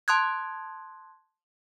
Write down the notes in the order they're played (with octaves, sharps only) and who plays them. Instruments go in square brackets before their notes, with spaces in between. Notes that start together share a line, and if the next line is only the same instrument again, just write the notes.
[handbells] A5 C6 D#6 F#6 G#6